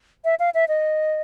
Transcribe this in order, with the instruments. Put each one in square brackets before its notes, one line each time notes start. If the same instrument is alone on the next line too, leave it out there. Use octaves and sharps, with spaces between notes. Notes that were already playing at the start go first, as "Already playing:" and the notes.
[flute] E5
F5
E5
D#5